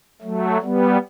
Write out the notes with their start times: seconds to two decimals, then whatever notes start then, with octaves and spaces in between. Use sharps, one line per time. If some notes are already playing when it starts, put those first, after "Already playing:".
0.22 F#3 A3
0.62 G3 B3